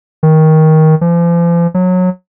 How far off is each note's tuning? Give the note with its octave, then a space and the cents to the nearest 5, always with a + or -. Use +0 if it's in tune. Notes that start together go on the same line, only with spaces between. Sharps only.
D#3 +15
F3 -40
F#3 -20